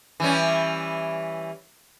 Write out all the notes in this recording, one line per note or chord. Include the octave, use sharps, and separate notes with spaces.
E3 G3 C#4